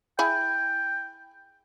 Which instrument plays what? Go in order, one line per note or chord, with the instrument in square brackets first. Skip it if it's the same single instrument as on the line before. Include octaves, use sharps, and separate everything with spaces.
[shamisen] E4 G#4 F#5 [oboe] G5